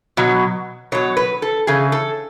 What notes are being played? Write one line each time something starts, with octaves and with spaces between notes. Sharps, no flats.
B2 F#3
B2 F#3 C#5
B4
A4
C#3 E3 G#4
A4